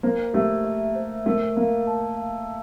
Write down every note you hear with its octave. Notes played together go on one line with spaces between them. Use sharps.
A#3 C5
A3 G4
E5
C5
A3 A#4
A#3 F5
A5
F5